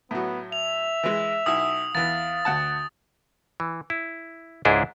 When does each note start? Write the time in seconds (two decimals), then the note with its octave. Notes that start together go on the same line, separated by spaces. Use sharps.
0.11 A2 F#3 B3
0.52 E5 F7
1.03 E3 G#3
1.46 B1 E4 D#6
1.95 E2 E3 F5 A6
2.45 D2 F#5 A5
3.60 E3
3.90 E4
4.65 C#2 G#2 D4 E4 G#4 G5